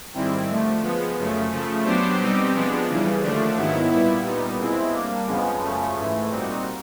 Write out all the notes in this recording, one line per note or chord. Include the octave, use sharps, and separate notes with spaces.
G#2 D#3 G3 C4 E4
D3 F3 A3
F3 G#3 B3
F#2 C#3 F3 A3
C#3 F3 A3
F#3 B3 D4 G4 C5
B2 G3 C4 D#4 G4
F3 G#3 B3 D4
D#2 C#3 E3 G3
D#2 D3 F3 A3 D4
G#2 D#3 F#3 B3 E4
A#2 G3 B3 E4
A#2 G3 B3 D#4
B2 G#3 C4 E4
G3 A#3 D4
F2 C#3 F3 G#3 B3
F#2 C#3 F3 A3 C#4
G#2 E3 A3
A#2 G3 C4 D#4 F#4